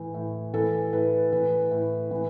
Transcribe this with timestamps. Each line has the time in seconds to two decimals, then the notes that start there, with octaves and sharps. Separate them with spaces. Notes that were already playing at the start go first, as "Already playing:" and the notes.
Already playing: A2 E3
0.14 A2
0.54 E3 A4
0.93 A2 B4
1.32 E3 B4
1.71 A2
2.11 E3